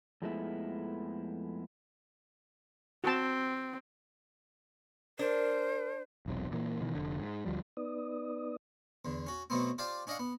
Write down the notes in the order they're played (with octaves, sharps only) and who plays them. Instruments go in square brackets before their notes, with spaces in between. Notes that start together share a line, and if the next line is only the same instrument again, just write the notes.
[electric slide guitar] F2 F3 G#3 A3 B3 E4
[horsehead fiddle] C4 [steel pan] F#4 A5
[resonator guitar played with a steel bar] D4 [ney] A#4 [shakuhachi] C5
[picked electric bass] E1 B1 C3
A#2 E3 A#3
B2 D#3 E3
F1 D3
G#2
D2 F3 G3
[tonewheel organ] B3 D#4 B4 D5 D#6
[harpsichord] E2 D3
C#4 F#4
B2 F#3 A3 B3 C4
F4 G4 C5 D5 F5 A5
C#4 D4 D#5 F5 F#5
B3